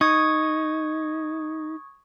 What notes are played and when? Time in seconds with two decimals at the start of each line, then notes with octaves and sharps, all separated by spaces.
0.01 D#4 C#6 D#6 G#6